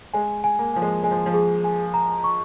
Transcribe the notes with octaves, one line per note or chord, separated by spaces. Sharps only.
G#3 G#5
G#5
A#3
F3 G#5
G#3
G#3 G#5
F3
F3
G#4
G#5
A#5
C#6